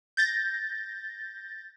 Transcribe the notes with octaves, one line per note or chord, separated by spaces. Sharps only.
G6 A6 A#6